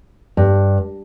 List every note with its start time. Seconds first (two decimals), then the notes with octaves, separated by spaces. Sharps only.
0.37 G2